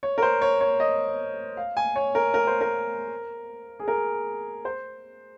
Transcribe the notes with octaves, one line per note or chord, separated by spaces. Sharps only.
C#5
A#4
C5
C#5
C#5
D#5
F5
G#5
C#5
A#4
A#4
C5
A#4
G#4
A#4
C5